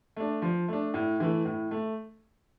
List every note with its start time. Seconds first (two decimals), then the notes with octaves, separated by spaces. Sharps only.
0.16 A3 D4
0.42 F3
0.68 A3 D4
0.94 A2
1.20 E3 A3
1.45 A2
1.71 A3